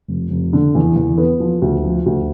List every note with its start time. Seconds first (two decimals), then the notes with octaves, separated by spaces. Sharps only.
0.08 F1
0.30 F1
0.53 D3
0.75 E2
0.96 E2
1.18 B3
1.40 F3
1.62 D2
1.83 F3
2.06 D2